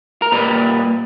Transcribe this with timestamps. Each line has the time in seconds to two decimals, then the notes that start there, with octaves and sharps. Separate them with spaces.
0.22 A#4
0.32 A#2 G3 A#3 B4